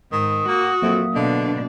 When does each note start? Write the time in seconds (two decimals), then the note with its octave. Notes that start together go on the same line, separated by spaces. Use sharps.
0.12 G#2 D#3 D#6
0.48 A#3 F#4
0.82 F2 F#3 A#3 E5
1.15 B2 D3 D4 D#5 F5